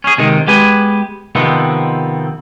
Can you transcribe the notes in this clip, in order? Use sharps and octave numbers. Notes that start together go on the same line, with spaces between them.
C#4 G#4
C3 D#3 G#3
G#3 B3 G4 B4 G#5
C3 D#3 F3 B3 C4